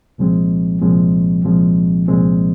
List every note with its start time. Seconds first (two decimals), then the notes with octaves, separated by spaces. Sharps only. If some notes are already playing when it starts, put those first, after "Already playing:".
0.18 C2 A#2 F3 G#3 C4
0.81 C2 A#2 F3 G#3 C4
1.45 C2 A#2 F3 G#3 C4
2.08 C2 A#2 F3 G#3 C4